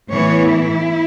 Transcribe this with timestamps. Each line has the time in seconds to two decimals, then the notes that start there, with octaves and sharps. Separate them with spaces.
0.11 A2 E3 B3 C#5
0.51 E4